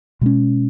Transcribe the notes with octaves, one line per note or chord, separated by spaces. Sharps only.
B2 G#3 C#4